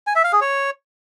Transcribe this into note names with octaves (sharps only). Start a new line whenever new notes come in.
G#5
E5
F5
G#4
C#5